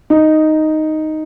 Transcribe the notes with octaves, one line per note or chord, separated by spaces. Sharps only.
D#4